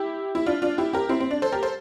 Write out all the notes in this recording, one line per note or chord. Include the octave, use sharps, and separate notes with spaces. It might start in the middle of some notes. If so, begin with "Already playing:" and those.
Already playing: E4 G4
E4
D4 F4
D4 F4
E4 G4
G4 A#4
C4 E4
C4
D4
A4 C5
G4 A#4
A4 C5